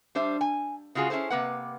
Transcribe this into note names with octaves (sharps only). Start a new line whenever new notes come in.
G3 D4 C5 E5
G#5
C#3 G#3 F4 F#4 G#4
C#4 E4 G#4 A4 C5
C3 A#3 B4 F#5